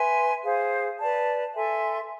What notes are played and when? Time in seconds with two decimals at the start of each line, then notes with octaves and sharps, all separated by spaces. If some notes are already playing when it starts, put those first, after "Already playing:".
Already playing: B4 E5 G#5 C6
0.43 G#4 C5 F5
0.99 B4 D5 A5
1.55 A4 E5 G#5 C6